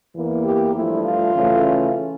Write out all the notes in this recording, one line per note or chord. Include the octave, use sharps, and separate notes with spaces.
E2 E3 A#3
G4
G2 F3 A3 E4
F4
C#3 E3 A3 C#4